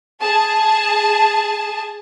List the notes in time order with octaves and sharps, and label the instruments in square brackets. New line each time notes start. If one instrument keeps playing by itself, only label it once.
[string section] G#4 A5